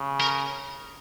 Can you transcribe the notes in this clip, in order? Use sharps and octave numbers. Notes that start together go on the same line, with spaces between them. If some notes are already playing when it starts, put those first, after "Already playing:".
Already playing: C#3
A#4